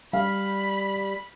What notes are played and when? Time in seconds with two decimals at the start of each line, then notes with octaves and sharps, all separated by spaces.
0.13 G3 F5 B5